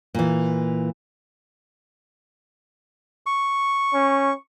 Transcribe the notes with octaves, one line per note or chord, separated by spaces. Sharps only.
A#2 E3
C#6
C#4